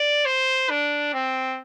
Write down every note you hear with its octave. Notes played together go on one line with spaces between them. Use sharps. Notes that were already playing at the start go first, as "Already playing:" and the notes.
Already playing: D5
C5
D4
C4